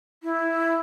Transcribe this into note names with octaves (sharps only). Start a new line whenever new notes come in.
E4